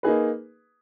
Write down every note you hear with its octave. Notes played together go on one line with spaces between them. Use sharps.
A#3 D#4 G#4 B4